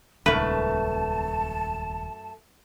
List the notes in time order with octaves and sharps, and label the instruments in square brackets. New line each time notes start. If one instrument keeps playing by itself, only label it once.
[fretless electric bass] D#1 C#2 D#3 [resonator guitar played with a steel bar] F#2 A3 [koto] B4 [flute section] A5